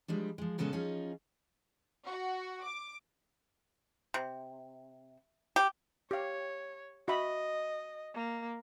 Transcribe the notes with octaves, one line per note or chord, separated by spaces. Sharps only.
F3 G3 G#3 D4
F3 G#3
A#2 C#3 G#3 B3 C#4 A4
F3 C#4 D#4 F4 G#4
F#4
D6
C3
G4
G4 C#5 F5
F#4 D#5 E5 B5
A#3